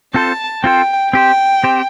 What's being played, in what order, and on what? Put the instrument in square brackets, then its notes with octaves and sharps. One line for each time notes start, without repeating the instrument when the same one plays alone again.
[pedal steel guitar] C4 F4 A4 C5 [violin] A5
[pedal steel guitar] C4 F4 A4 C5 [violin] G5
[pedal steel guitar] C4 G4 C5 [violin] G5
[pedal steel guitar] C4 G4 C5